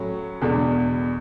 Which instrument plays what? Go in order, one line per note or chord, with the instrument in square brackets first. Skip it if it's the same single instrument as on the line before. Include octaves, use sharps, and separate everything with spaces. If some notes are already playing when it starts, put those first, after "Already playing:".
Already playing: [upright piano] A2 F#3 C#4
E2 B2 G#3 D4